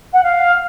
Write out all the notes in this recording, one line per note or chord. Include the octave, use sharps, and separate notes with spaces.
F#5
F5